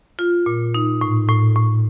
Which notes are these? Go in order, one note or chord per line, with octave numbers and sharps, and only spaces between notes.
F4
A#2
D#4
A2
A2
A2